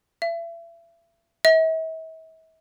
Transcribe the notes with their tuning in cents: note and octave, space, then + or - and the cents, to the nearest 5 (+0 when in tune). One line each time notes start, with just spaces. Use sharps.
E5 +35
E5 -40